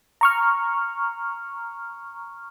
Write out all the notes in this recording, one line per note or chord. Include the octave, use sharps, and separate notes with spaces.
A#5 C#6 F6